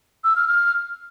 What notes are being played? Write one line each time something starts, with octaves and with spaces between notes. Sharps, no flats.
E6
F6
F6